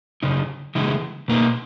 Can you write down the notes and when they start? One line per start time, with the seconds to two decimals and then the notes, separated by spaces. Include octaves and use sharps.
0.23 F#2 C#3 D#4
0.75 C#3 E3 G#3 D#4
1.28 B2 A#3 D#4